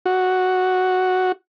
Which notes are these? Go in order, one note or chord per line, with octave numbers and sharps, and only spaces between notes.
F#4